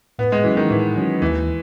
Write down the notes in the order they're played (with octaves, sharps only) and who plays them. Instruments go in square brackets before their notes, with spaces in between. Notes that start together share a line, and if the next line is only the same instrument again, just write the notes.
[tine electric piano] A2 [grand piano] B3
[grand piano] G#3
[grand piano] E3 [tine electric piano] F#3 C#4 F#4
[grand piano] D#3
[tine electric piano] A2 [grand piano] E3
[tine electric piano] F#3 C#4 F#4
[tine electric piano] D#2 [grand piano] E3